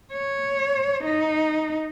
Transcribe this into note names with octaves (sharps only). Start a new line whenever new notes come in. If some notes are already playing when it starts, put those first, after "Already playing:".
C#5
D#4